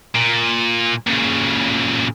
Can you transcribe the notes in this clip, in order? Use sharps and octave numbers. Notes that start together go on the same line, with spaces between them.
A#2
A#2 C#3